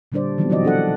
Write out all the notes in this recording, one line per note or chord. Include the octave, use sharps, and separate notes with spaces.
A#2 D3 G3 D4 C5 D5
D#3 E3 F#3 G3 B3 C4
B2 F3 F#3 F#4 D5 D#5
B3 D4 A4 F#5